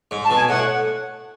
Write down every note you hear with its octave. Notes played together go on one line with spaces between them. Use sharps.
G#2
A5
B2
G#5
A2 F#5